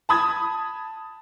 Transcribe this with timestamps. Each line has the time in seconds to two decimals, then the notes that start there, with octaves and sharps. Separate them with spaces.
0.09 A5 B5 D#6 G#6